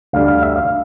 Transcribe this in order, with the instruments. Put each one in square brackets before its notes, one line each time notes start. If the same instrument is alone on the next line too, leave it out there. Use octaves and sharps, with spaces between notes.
[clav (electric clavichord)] D2 D3 G3 F5
F5
E5
F5